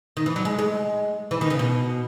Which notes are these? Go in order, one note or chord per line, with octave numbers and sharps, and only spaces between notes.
D#3
E3
F#3
G#3
G#3
E3
D#3
C#3
B2